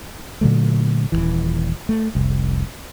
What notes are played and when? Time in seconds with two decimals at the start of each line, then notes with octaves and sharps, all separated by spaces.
0.41 A#2 D3 F#3 A3
1.12 D#1 A#1 E3
1.89 A3
2.15 F1 C2